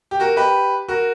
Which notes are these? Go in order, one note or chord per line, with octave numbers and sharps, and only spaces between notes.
G4
F#4 A#4
G4 B4
F#4 A#4